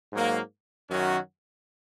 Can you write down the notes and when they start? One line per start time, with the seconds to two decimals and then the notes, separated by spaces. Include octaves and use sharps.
0.13 G#2 F#3 A#3
0.90 F#2 D#3 F#3 C#4 F#4